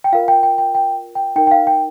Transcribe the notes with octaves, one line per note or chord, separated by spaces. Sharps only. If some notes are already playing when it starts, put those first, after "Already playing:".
G5
F4 A#4 F5
G5
G5
G5
G5
G5
D#4 A#4 G5
G5
F5
G5